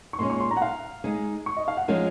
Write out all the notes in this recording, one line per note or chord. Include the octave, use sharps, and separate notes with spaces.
C#6
A#2 G#3 C#4 C6
C#6
C6
A#5
F#5
F5
G#3 D#4 G#4
C#6
D#5
F5
F#5
F3 G#3 C#4 F4 A#4